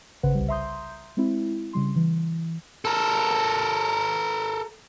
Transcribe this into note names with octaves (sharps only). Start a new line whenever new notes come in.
G#1 C#3 B4 C5 F#5
C2 G3
E5 A#5 C6 D#6 G6
G#3 C4 E4
C#3 G3 C6
E3
A4 A#4